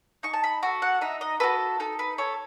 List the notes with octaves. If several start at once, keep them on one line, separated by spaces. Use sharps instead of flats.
D#4 C#6
A5
B5
F#4 A4
F#5
D#4 E5
D#5
F#4 A4 B4
D#4 A4
B4
A4 C#5